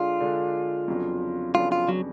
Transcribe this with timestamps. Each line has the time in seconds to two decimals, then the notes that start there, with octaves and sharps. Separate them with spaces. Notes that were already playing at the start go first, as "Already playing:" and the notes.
Already playing: D3 G#3 D4 F4
0.20 D3 G#3 D4
0.88 F2 C#3 F#3 B3 D4
1.55 F2 C#3 F#3 B3 D4 F4
1.72 F4
1.89 F#3